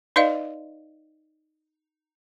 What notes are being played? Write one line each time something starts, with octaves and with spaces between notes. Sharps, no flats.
D#4 B4 D5 D#5 F5